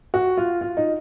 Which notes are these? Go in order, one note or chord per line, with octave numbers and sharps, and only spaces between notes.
F#4
F4
F4
D#4